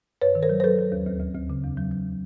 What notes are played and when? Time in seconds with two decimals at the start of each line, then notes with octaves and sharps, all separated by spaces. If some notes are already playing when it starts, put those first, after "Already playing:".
0.22 G2 B4 C#5
0.35 D#3
0.43 A#4 C5
0.49 F#3
0.60 C5
0.64 F#3 A4 B4
0.79 F#3
0.92 D#2
1.06 D2
1.21 D2
1.35 D2
1.50 C#3
1.64 E2
1.77 F#3
1.91 F#3